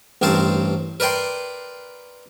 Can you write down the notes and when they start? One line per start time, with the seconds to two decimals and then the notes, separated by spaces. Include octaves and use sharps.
0.22 A1 G2 C4 A#4 C5 A5
1.00 A#4 B4 D5 G5 C6